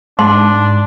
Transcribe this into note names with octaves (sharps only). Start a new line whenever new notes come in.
G#2 D4 A5 C6